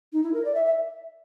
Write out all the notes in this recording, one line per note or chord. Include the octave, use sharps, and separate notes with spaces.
D#4
E4
A#4
D5
E5
E5